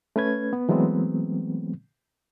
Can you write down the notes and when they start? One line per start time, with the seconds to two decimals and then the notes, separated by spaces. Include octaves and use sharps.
0.16 A3 C#4 B4 G#6
0.53 B3
0.69 E3 F#3 G#3 A3 B3 C4